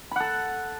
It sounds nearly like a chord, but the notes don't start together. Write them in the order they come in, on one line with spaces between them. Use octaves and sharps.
B5 F#5 A4